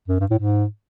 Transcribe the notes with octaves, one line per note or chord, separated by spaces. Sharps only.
F#2
G2
A2
G#2